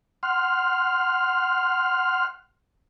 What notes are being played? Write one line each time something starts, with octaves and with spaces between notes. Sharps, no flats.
F#5 C6 F6